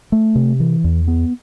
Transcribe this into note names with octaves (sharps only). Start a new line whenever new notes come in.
A3
C3
E3
E2
B3